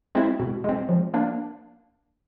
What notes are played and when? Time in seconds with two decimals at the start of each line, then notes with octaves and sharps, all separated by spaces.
0.15 G#3 C4 E4
0.40 B2
0.64 G#3 C4
0.89 F3
1.14 A#3 D4